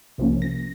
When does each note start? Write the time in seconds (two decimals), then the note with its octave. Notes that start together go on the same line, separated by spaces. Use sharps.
0.18 C2 C3 F3 A#3 C#4
0.42 A#6